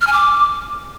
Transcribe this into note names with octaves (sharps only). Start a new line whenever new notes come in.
F6
G#5
D6